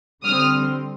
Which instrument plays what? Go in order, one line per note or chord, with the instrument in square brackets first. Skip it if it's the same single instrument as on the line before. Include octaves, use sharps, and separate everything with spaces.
[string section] D3 G3 C4 D#6 F6